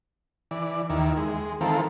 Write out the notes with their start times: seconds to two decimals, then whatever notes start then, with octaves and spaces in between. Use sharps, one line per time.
0.51 E3 D5
0.90 D#2 D#3 E4
1.17 G#3
1.61 D#3 E3 C4 F4 A4 A#4